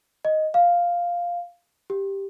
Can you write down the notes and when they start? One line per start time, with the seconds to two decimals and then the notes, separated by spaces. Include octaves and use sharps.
0.25 D#5
0.54 F5
1.90 G4